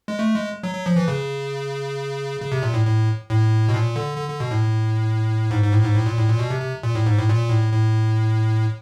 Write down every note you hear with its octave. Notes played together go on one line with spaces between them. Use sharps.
G#3
A3
G#3
F#3
F#3
F3
E3
C#3
C#3
C3
A#2
A2
A2
A2
B2
A#2
D3
D3
D3
B2
A2
G#2
G#2
A2
G#2
A2
A#2
A2
A#2
B2
C3
C3
A#2
A2
G#2
A2
A#2
A2
A2